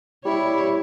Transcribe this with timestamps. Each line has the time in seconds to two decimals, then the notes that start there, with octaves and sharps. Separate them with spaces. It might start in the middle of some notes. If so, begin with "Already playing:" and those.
0.25 G3 E4 C#5